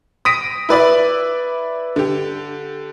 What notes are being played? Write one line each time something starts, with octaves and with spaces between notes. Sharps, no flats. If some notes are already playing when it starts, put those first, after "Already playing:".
D#6 A#6 B6 D7 D#7
E4 B4 D5 E5
D3 G4